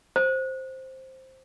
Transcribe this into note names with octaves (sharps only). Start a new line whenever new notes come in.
C5